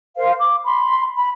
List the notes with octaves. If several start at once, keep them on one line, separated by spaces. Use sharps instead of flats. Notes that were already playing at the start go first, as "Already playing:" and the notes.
A#4 C5 F5
D6
B5 C6
B5